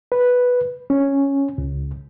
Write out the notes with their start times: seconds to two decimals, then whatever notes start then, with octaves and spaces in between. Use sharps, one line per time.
0.12 B4
0.90 C#4
1.58 C#2